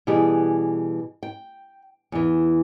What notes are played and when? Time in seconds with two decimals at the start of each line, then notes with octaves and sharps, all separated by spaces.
0.07 B2 E3 G3 G4 G#4
1.23 G5
2.12 E2 E3